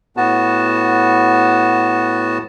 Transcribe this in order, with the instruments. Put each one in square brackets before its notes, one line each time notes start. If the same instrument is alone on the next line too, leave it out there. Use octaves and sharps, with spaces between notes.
[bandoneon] A2 B3 F#4 A5